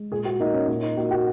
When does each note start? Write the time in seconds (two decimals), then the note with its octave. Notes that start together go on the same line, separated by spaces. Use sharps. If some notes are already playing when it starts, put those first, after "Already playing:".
Already playing: G#3
0.12 A#2 G#4
0.25 F#4
0.40 A#3 D#4
0.54 C#4
0.68 A#2 D#4
0.82 D#4
0.97 A#3 F#4
1.11 F#4